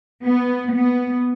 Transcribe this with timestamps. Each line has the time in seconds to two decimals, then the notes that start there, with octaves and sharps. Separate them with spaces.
0.24 B3
0.75 B3